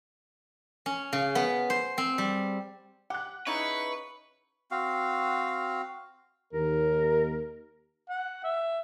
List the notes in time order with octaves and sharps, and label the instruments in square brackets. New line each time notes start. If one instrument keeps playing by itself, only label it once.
[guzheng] C#4
C#3
B3
C5
C4
G3
[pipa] G4 [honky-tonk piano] F#5 F#6
[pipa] C#3 D#4 E4 [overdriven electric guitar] B4 [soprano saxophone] C#6
[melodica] C4 F#4 F5
[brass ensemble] D#2 [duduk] A#4
[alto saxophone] F#5
E5